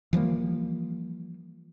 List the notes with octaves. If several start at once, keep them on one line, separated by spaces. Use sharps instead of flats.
E3 F3 G3 A#3